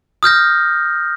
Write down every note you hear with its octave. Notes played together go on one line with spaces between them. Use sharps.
D#6 F6 G6 A#6